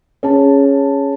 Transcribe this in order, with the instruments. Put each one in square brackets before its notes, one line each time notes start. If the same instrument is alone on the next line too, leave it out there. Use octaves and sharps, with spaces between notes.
[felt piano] C#4 G#4 A5